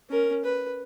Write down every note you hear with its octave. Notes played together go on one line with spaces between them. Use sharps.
C#4 A#4
B4